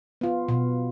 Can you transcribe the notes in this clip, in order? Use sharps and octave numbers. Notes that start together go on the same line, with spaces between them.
B3 F4
B2